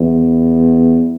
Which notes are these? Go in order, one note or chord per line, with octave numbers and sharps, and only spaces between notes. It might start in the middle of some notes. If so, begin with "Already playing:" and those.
Already playing: E2